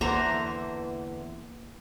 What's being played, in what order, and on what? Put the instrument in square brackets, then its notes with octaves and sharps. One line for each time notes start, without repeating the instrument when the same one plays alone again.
[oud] E2 D3 E3 [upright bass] A#3 [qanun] C5 A#5